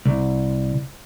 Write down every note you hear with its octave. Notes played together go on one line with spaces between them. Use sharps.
C2